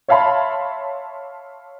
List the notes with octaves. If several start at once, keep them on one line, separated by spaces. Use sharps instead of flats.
C#5 E5 F5 A5 B5 C6